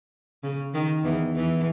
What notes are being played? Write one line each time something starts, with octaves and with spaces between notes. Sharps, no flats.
C#3
D#3
E2 E3
E2 E3